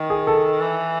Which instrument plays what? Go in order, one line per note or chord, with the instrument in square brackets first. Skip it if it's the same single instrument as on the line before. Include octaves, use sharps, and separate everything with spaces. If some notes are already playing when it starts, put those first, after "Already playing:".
Already playing: [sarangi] D#3
[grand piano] G#4
A4
[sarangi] E3